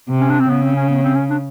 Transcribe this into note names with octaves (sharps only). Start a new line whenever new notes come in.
C3
C#4
D4
C4
C#3 B3
C4
C#4
B3
C4
C#4
D4